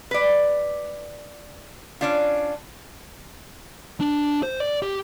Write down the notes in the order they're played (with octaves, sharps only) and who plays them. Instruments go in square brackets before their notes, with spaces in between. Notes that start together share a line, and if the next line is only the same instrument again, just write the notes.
[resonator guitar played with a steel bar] B4 D5
C#4 D4 F4
[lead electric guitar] D4
C5
D5
G4